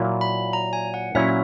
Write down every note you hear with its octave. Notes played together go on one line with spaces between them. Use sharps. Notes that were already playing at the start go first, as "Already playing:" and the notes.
Already playing: A#2 F#3 A#3 E4
B5
A#5
G#5
F#5
A#2 F#3 C#4 E4 E5